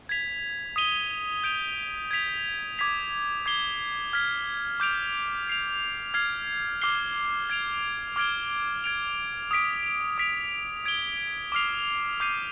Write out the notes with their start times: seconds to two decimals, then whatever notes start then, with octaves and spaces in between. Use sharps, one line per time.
0.09 G#6 B6 F7
0.76 D#6 B6 D#7 G7
1.44 G6 D7 F7
2.11 G#6 B6 F7
2.78 D6 G#6 B6 F7
3.46 D6 G#6 C7 G7
4.13 F6 G#6 B6
4.80 D6 G6 D7 F7
5.47 G#6 C7 F7
6.14 F6 G#6 C7
6.81 D6 F6 C7 G7
7.50 G#6 D7 F7
8.16 D6 F6 G#6 D7 G7
8.84 G#6 D7 F7
9.51 D#6 B6 D7
10.18 D#6 B6 D7 F7
10.86 G#6 D7 G7
11.52 D6 F6 C7 F7
12.20 D6 G6 C7 D#7